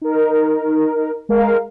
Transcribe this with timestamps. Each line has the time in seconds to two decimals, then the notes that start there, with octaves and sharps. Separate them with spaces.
0.01 D#4 A#4
1.29 G#3 A#4 F5